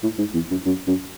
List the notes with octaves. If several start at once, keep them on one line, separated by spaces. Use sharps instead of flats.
A2
G#2
E2
F#2
F#2
F#2